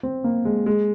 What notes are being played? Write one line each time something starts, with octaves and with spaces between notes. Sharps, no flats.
C4
A#3
G#3
G#3